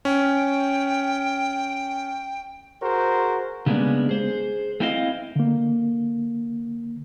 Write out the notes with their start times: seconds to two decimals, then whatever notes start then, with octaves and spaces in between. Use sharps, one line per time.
0.05 C#4 G5
2.82 F#4 G#4 A#4 C5
3.66 C#3 G3 G#3 A#3 B3 D4
4.09 G#4 C5
4.80 A3 C4 E4 C5 D#5 F5
5.36 D3 A#3